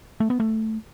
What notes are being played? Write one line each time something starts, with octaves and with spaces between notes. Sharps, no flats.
A3
B3
A3